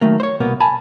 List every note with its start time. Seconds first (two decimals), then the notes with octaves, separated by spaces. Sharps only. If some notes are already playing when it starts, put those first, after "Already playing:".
0.01 D#3 F#3 A3 A#3
0.20 C5 C#5
0.40 C2 B2 A#3 B3
0.60 G#5 A5 B5